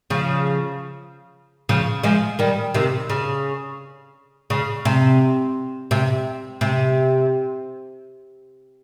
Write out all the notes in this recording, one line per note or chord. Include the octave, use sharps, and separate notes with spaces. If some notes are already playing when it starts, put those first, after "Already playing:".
C#3 F3
C#3 F3
F3 G#3
D#3 G3
C3 D#3
C#3
C#3
C3
C3
C3